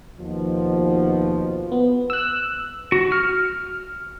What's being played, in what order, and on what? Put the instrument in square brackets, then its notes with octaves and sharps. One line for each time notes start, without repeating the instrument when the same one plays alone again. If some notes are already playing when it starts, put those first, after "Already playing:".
[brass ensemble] D#2 B2 F3
[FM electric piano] B3
E6 F#6
[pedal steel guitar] F#4
F6